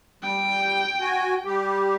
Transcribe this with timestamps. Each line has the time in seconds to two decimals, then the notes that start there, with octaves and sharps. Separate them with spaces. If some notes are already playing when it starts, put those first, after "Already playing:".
0.23 G3 G5
1.00 F#4 G#5
1.45 G3 G4